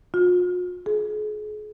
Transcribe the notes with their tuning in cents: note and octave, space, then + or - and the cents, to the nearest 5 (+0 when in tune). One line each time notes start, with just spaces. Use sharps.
F4 +45
G#4 +35